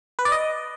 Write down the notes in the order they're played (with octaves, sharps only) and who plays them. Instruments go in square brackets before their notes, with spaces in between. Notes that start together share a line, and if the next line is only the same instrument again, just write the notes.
[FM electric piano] B4
D5
D#5